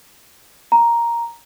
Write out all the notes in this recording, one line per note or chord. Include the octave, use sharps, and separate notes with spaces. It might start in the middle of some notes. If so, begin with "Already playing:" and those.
A#5